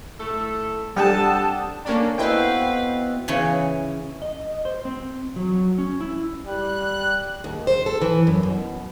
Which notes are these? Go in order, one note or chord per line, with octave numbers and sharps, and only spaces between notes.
A3 E4 A4
C3 G3 D4 A4 F#5 G5 A5 D#6
A#3 C#4 D4 A4
B2 C4 E4 B4 F5 G5
C#3 E3 C#4 C#5
D#5
C5
C4
F#3
C#4
E4
G3 F#6
D#2
C5
A4
E3
F#2
B2